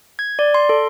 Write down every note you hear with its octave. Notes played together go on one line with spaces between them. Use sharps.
G#6
D5
C6
A4